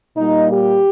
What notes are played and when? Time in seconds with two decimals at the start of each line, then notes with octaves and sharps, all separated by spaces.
0.16 A#2 G3 A#3 D#4
0.50 G4